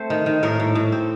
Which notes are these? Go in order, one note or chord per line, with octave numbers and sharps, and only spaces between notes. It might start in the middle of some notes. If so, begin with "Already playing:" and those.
Already playing: A3 C4 C5
D#3
D#3
A2 A#4
A2
A2
C4